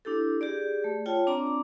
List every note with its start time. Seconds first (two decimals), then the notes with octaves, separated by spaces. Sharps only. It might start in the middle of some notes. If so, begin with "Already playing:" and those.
0.05 D4 E4 G4 A4
0.41 G4 G#4 D5
0.84 A3
1.06 F4 C#5 G5 A5
1.27 C4 D4 D5 A#5 C6 D6